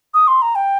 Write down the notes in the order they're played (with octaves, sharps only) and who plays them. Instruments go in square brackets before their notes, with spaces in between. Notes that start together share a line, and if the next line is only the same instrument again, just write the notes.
[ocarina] D#6
C6
A#5
G5